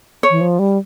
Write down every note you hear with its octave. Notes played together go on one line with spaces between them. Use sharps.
C#5
E3
F3
G3